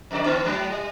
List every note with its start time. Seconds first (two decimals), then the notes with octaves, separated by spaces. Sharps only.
0.11 F2 D3 D5
0.25 D3 B3 C#4
0.45 G#2 F#3
0.70 G3